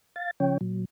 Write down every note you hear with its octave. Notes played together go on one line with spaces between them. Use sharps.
F5 A6
C#3 F3 C#4 C#5 G5
A#2 F#3